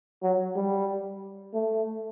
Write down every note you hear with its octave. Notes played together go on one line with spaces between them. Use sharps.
F#3
G3
A3